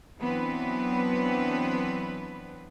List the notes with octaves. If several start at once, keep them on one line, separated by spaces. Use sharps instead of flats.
E3 F#3 B3 C4 D4 B4